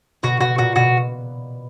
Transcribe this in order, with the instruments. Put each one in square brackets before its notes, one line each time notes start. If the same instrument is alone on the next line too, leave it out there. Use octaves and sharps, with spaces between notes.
[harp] B2 [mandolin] F#4
[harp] B2 [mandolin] F#4
[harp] A#2 [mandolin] F#4
[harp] B2 [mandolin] F#4